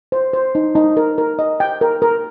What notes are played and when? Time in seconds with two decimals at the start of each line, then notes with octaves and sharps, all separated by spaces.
0.12 C5
0.33 C5
0.55 D#4
0.75 D#4
0.97 A#4
1.18 A#4
1.39 D#5
1.60 G5
1.81 A#4
2.02 A#4